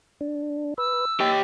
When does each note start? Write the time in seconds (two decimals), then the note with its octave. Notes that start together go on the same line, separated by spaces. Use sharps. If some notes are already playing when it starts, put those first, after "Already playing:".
0.21 D4
0.78 B4 E6
1.20 G4 D#5 G5 A6